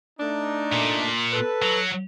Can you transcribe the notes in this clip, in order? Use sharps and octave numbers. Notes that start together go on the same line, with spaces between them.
A3 D4 D#4
A#2
A4 B4
F#3